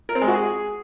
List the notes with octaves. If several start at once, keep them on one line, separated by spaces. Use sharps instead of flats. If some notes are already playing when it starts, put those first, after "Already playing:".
A#4
C4
G#3
F#4
G#4